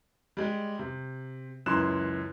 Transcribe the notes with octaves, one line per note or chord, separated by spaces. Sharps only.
G3 G#3 G4
C3
C#2 F#2 E3 C6 F#6 E7